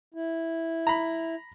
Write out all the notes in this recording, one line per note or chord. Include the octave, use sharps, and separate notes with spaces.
E4
A#5 B5